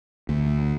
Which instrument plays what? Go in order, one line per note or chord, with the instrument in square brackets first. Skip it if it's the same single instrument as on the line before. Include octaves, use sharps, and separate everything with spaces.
[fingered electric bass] D2